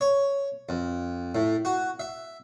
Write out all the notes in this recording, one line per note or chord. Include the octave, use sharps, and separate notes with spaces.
C#5
F2
A2
F#4
E5